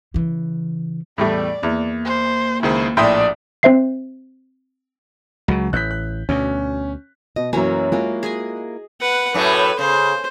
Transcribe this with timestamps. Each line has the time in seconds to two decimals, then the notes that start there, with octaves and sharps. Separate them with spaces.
0.14 C#3 E3
1.18 E2 A2 G3 A3 D5
1.63 E2 A#3
2.06 C5
2.63 C#2 D#3 E4 G#4 C5
2.97 A#1 A2 D5 E5 G5 C6 D#6
3.63 C4 C5 E5 C7
5.48 C#2 C#3 F#3
5.73 A1 F#6 G6 B6
5.91 F#6
6.29 D2 B2 C#4
7.36 B2 D#5
7.53 F#2 E3 F#3 A#3 C#4 F#4 C#5 G#5
7.92 G#3 A#3 E4 F4
8.23 G#4 D#5 G#5
9.00 B4 F#5
9.34 F#2 A2 A3 B4
9.79 C#3 C5